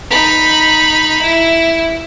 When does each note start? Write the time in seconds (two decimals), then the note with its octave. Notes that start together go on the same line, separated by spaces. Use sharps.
0.11 D#4 B5
1.22 E4